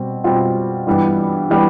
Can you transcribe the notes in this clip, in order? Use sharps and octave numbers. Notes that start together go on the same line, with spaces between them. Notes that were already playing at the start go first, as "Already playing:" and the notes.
Already playing: B2 G3 C4
B2 G3 C4 F4
G2 E3 G3 B3
E3 G3 B3